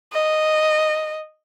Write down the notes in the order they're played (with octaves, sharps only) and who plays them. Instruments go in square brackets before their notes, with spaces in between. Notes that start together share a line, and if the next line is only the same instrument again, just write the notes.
[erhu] D#5